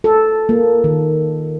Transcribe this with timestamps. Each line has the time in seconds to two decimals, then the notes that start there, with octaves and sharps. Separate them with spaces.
0.04 A4
0.49 A#3
0.84 D#3